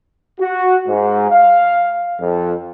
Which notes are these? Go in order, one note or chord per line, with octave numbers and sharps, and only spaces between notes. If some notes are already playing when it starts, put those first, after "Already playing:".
F#4
G#2
F5
F2